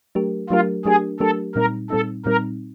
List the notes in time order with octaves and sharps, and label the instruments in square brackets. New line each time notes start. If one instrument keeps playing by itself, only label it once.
[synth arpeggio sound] F#3 A3 D4 G4 A#4
[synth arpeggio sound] F#3 A3 D4 G4 A#4 [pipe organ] F4
[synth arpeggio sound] F#3 A3 D4 G4 A#4 [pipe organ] G#4
[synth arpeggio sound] F#3 A3 D4 G4 A#4 [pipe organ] A4
[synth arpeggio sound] A#2 G3 C4 D#4 [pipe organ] A#4
[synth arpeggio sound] A#2 G3 C4 D#4 [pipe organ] A4
[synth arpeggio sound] A#2 G3 C4 D#4 [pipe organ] A#4